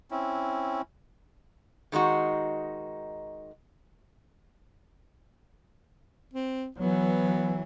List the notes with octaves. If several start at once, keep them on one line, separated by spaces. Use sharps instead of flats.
C4 C#4 E4
D#3 G#3 D#4 F#4
C4
E3 F#3 B3